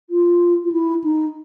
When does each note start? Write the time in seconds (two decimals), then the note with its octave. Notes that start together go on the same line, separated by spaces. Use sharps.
0.10 F4
0.64 F4
0.72 E4
1.04 D#4